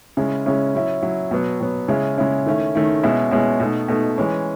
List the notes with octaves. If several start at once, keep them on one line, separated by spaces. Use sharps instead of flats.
C#3 G#3 C#4 E4
C#3 G#3 C#4 E4
F#3 C#4 E4
F#3 C#4 E4
B2 F#3 B3
B2 F#3 B3
C#3 G#3 C#4 E4
C#3 G#3 C#4 E4
D#3 A3 C#4 E4
D#3 A3 C#4 E4
B2 G#3 C#4 E4
B2 G#3 C#4 E4
B2 A3 D#4
B2 A3 D#4
E3 G#3 C#4